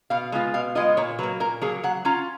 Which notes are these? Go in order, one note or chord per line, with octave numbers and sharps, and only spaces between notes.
B2 F5
G#3 B3 F4
B2 F5
G#3 B3 F4 D#5
A#2 C#5
F#3 A#3 B4
A#2 A#4
F#3 A#3 G#4
F#3 F#5
C#4 F4 A#5